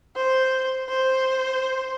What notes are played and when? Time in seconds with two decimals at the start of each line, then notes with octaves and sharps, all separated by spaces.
0.16 C5
0.89 C5